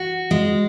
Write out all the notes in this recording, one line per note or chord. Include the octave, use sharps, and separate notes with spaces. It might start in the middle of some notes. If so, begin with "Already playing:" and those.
Already playing: F#4
G#3